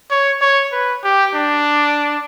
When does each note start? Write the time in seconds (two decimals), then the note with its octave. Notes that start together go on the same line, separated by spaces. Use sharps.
0.11 C#5
0.41 C#5
0.72 B4
1.04 G4
1.34 D4